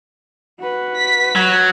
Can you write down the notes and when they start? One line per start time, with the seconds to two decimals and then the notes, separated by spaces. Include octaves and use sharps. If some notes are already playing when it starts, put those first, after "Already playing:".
0.60 F#4 B4
0.99 B6
1.35 F#3